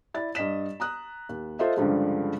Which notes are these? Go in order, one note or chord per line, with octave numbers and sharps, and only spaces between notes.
E4 D5 A6
G2 D#5 B6 E7
A#5 D#6 F#6
D#2
F4 A4 C5 D#5 E5
C#2 G2 D3 F3 G#3